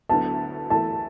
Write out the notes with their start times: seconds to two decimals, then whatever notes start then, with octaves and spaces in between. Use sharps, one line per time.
0.09 D2 D3 F#3 B3 E4 A5
0.70 E3 A3 E4 A4 A5